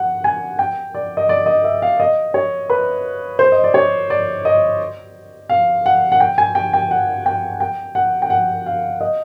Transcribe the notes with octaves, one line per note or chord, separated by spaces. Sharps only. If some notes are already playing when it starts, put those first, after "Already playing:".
Already playing: F#5
G#5
G5
D5
D#5
D5
D#5
E5
F5
D#5
C#5
B4
C5
D#5
D5
C#5
D5
D#5
F5
F#5
F#5
G5
G#5
G5
G5
F#5
G5
G5
F#5
G5
F#5
F5
D#5